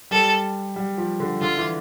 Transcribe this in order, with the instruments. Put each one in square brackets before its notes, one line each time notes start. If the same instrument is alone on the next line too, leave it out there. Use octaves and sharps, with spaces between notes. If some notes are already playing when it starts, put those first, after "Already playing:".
[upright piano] G3 [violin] A4
[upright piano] G3
F3
D3
[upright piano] D3 [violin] F4
[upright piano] E3